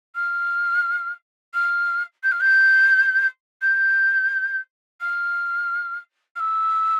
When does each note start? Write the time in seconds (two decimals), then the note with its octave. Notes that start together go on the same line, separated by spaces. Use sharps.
0.15 F6
1.54 F6
2.23 G6
2.32 F6
2.41 G6
3.62 G6
5.01 F6
6.36 F6
6.40 E6